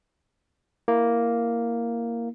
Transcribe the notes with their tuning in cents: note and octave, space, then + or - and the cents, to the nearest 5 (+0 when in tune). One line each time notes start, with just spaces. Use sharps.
A#3 +0 E4 +10